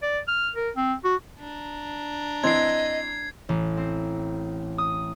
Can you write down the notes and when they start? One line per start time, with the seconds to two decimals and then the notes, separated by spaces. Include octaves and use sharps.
0.02 D5
0.28 F6
0.55 A#4
0.77 C4
1.04 F#4
1.39 D4 A#5
2.44 E3 C4 D#5 G#6 C7
3.49 A1
3.77 C4
4.78 D#6